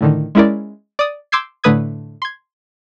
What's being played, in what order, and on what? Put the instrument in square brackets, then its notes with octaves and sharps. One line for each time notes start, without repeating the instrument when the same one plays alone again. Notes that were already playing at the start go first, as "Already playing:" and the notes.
[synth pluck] A2 D3 D#3
G#3 C#4 E4 A#4 D5
D5 D#6
C6 D6 E6 G6 G#6 C7
A2 D3 A3 B4 D#6 G#6
C6 G#6